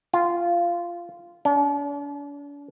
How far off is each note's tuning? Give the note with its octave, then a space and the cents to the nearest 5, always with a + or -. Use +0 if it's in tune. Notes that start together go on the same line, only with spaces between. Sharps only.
F4 -10
D4 -45